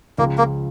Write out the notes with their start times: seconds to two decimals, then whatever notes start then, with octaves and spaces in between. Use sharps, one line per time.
0.18 C#2 C#3 F3 A#3
0.38 A#3